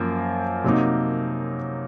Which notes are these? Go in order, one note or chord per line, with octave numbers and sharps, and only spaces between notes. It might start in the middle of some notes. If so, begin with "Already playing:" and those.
Already playing: F#2 F3 A#3
C3 F#3 A#3 D#4